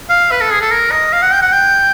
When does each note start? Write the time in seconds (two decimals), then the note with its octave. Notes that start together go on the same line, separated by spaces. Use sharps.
0.10 F5
0.31 B4
0.41 A4
0.51 G#4
0.61 A4
0.71 A#4
0.91 D#5
1.13 F5
1.22 F#5
1.33 G5
1.42 F#5
1.52 G5